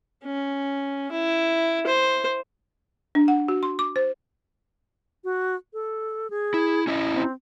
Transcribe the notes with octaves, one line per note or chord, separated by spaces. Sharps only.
C#4
E4
C5
D4
F#5
F#4
C6
D6
C5
F#4
A4
G#4
E4
C#4 E4 D#5
C4